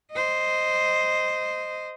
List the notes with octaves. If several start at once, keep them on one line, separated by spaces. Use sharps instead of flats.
C5 D#5